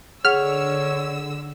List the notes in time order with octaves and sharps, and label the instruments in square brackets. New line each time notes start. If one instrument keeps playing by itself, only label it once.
[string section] D3 E6 [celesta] G#4 F#5 [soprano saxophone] C#5 [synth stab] F6